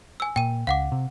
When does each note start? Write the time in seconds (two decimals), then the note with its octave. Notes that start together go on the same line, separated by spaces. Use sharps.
0.20 G#5 E6
0.36 A#2 G5 D#7
0.67 C#2 F5 F#5 D6
0.92 C3